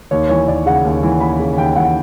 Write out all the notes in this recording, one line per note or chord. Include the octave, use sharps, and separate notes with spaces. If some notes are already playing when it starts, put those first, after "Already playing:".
D#2 C#5
E3 C#5
D#2 D5
C#3 F#5
D#2
E3
D#2 B5
C#3
D#2 G5
E3 F#5